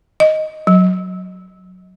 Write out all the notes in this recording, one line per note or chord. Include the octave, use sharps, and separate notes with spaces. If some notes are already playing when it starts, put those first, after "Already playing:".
D#5
F#3